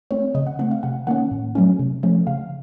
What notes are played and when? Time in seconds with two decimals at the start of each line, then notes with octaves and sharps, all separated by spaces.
0.11 A3 C4 C#5
0.35 C#3 D#5
0.46 F#5
0.59 A3 C4 F#5
0.71 F5
0.83 C3 F#5
1.07 D#3 A#3 C#4 F#5
1.31 A2
1.55 F#3 A3 C#4
1.79 C3
2.03 F3 A3 C#4
2.27 C#3 F5